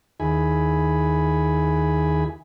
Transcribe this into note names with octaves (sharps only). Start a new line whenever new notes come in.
D#2 E4 G#4 G#5 B5